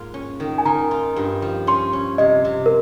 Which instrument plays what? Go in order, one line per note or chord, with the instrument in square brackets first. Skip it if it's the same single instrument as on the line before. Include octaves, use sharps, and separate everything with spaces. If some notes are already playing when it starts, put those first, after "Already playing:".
Already playing: [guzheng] G#2 A#3 F4
C#4
D#3
[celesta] G#5
[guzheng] D#3 [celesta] A#5
[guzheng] F4
G2
F3
[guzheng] C#4 [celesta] C6
[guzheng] C#4
[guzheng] C3 [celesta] D#5
[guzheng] C3
[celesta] A#4